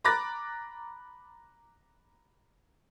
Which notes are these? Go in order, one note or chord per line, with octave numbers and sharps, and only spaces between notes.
A#5 B5 D6 F#6 A6 A#6